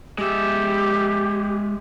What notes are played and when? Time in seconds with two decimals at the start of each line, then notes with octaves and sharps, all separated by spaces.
0.18 G#3 G4 E5